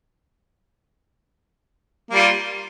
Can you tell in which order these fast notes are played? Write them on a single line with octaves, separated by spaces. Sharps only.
A#3 G3 F4